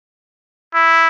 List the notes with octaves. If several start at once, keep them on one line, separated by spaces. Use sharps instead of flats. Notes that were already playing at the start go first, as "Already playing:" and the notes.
E4